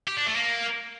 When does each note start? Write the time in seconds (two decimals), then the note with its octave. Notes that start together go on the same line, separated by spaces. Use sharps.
0.08 G4
0.17 D4
0.26 A3
0.36 A#3